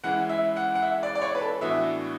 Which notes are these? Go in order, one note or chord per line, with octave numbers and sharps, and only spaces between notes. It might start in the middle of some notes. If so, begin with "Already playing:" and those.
E3 G#3 C#4 E4 F#5
E5
F#5
F#5
E5
D5
D5
C#5
B4
A4
A2 E3 B3 D4 F#4 E5